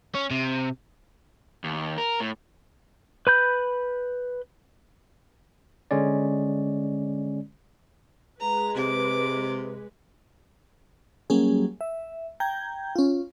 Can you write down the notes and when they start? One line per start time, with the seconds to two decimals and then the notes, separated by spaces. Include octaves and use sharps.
0.15 C#4
0.31 C3
1.64 D#2
1.98 A#4
2.20 A2
3.27 B4 B5 G6
5.91 D3 G#3 C#4 D5
8.40 G#3 B4 A#5
8.77 C3 D6
11.30 F#3 G3 A#3 C#4 G#4
11.81 E5
12.40 G5 A#5 G6 G#6
12.96 C#4 F4